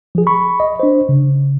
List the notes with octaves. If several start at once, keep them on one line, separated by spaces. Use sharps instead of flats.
F3 G#4
B5 C#6
D#5
D4 C5
C#3